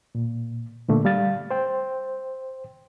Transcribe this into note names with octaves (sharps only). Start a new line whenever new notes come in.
A#2
A#2 D3 A3 A#3
G3 F5 A6
C5 G5